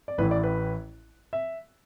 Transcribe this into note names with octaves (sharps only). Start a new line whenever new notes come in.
D5
A1 A2 E3 B4
D5
B4
E5